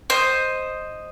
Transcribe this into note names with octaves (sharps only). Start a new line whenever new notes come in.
C5 D#5